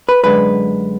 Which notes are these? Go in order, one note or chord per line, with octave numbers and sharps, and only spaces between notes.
B4
F#2 D3 G#3 B4